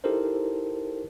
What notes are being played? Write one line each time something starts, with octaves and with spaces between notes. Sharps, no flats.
D#4 E4 G4 A4 A#4 C5